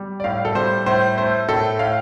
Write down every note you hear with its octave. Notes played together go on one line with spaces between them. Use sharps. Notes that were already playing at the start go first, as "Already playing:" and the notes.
Already playing: G3
D5
A2 F5
A4
G3 C5
A2 C5
A3 C5
A2 A4
A2 F5